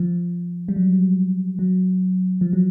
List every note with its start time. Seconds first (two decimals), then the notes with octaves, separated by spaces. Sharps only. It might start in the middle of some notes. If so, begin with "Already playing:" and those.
Already playing: F3
0.68 G3
0.76 F#3
1.59 F#3
2.41 F3
2.53 F#3